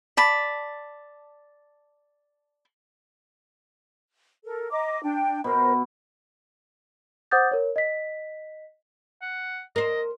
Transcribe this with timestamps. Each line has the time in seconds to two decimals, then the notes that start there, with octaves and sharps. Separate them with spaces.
0.17 D5 A5 B5
4.44 A4 A#4
4.71 D#5 A#5 D6
5.02 D4 G5
5.44 B2 A#4 C5 B5
7.31 C5 F#5 D6 D#6 G6 A6
7.51 A#4 C#5
7.76 D#5 B6
9.22 F#5
9.76 A#4 C5 D#5